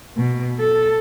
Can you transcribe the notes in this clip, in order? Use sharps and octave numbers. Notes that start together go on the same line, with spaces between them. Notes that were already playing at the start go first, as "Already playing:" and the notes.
B2
A4